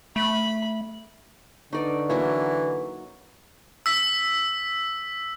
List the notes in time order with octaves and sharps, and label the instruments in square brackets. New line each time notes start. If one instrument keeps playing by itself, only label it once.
[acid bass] A3 [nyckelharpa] B5
[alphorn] D3 [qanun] D#4 D5 [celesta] B4 D#5 C#6
[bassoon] E3 [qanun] F#3 A#3 C#4
[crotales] E6 B6